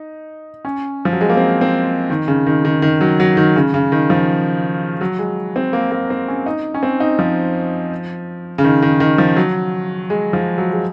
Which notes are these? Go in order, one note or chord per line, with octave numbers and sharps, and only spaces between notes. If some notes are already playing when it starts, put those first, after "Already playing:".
Already playing: D#4
C#4
F3
F#3
G#3
A#3
C4
C4
D#3
C#3
D#3
D#3
D#3
F#3
F#3
D#3
C#3
C#3
D#3
F3
F#3
G#3
C4
A#3
A#3
C4
C#4
D#4
C#4
C4
D#4
F3
C#3
D#3
D#3
D#3
F3
F#3
G#3
F3
F#3
G#3